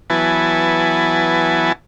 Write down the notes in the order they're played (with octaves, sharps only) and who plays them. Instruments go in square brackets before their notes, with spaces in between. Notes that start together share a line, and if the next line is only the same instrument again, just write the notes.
[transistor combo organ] E3 F#3 B3 E4 G#5 A5